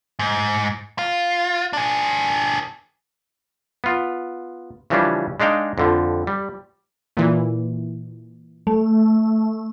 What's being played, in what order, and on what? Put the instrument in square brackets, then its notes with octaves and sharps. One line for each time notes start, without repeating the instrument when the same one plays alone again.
[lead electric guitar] G#2
F4
D4 G#4
[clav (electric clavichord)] B3 F4
C#3 E3 F3 G3 C#4 D4
G#3 D4 D#4 F5 G5
F2 D3 F3
G3
[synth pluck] A#2 E3
[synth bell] A3